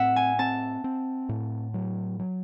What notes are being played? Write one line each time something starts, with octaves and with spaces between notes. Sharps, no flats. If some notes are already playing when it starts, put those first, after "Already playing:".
Already playing: A2 C4 E5 F#5
G#5
C4 A5
C4
A2
F#3
F#3